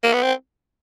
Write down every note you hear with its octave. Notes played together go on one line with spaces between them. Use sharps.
A#3
B3
C4